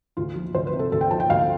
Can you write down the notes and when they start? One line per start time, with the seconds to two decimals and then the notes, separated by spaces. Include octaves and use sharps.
0.17 D2 F4
0.36 F3
0.55 D2 C5
0.67 B4
0.73 C3
0.79 A4
0.92 D2 A4
1.01 G5
1.11 F3 A5
1.20 G5
1.30 D2 F5